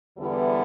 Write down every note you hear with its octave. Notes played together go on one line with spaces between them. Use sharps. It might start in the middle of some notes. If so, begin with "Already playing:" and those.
E2 D3 G3 B3 E4